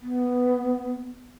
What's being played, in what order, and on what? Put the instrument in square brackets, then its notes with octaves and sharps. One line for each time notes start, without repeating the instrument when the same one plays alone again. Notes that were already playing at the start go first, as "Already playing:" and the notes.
[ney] B3